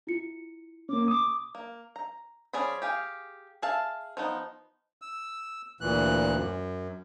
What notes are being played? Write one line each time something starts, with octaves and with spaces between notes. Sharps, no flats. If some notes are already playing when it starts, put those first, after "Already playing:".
E4 F4 C#7
A#3 C#4 D6
D6 D#6
A#3
A#5
F3 C#4 G#4 D5 B5
G4 G#4 F5
G#4 E5 F5 A5
F3 B3 D#4
E6
D2 A#2 E3 F#6
F#2